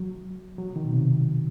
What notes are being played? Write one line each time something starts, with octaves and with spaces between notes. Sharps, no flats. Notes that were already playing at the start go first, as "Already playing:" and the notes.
Already playing: F#3
F#3
D#3
B2
C3